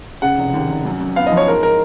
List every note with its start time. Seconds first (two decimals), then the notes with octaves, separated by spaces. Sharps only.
0.22 C#3 F#5
0.38 F1
0.54 D#2
0.70 F1
0.85 F#2
1.01 F#2
1.16 B3 F5
1.27 D#5
1.32 F3
1.37 C#5
1.47 G#2 A#4
1.63 A#4